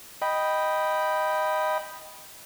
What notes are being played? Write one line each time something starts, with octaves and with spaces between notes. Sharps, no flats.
D#5 G5 B5